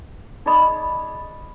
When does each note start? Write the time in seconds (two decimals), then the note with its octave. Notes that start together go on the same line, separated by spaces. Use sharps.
0.46 D#4 G#4 D5 D#5 B5 D#6